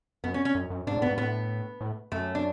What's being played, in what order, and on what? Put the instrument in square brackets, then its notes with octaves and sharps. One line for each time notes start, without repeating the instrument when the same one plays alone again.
[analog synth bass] F#2 [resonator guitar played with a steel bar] B3
[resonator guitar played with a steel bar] C#4
C#4
[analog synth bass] F#2
F#2
[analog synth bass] G#2 [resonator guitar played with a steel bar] D4
[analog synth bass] A2
[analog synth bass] G#2 [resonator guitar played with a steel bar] B3
[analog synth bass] A2 [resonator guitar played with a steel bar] B3
[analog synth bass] A2
[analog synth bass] F#2 [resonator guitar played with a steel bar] A3
[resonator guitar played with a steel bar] D4